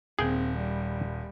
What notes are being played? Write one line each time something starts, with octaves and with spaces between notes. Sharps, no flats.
D#1 C4 G#4 G5
G3